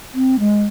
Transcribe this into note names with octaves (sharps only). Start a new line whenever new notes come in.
C4
G#3